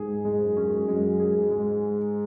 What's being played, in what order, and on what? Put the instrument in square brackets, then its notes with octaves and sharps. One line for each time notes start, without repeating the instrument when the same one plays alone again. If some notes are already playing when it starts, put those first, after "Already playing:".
Already playing: [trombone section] G#2 [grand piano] G#4
[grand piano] G#3
[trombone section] F#2
[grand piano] C#4
[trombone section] F#2 [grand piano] G#3
[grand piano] G#4
[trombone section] G#2
[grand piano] G#3